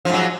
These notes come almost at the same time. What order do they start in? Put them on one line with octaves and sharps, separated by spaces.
F3 G#2 F#3